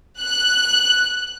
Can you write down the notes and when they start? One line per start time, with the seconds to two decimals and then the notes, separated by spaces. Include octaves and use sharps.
0.20 F#6